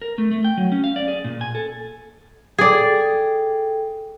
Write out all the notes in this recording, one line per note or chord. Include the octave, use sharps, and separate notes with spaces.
A#4
A3
A3
G5
F#3
C#4
F5
D5
G#4
A#2
G#5
A4
G#4 A4 D5 G5